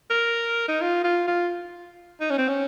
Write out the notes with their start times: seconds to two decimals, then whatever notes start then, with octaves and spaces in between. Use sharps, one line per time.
0.10 A#4
0.68 D#4
0.81 F4
1.04 F4
1.27 F4
2.20 D#4
2.30 C#4
2.38 C4
2.48 C#4